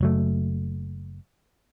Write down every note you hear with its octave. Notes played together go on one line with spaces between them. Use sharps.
F#1 F#3 A3